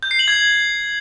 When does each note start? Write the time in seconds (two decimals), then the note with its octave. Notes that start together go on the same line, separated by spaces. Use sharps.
0.03 G6
0.11 C7
0.19 F#7
0.28 G#6